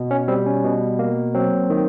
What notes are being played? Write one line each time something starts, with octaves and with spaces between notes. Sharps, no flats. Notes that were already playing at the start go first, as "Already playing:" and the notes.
Already playing: B2
C#4
G3 C4
C#4
B2
A#3
F#3 C4
D#3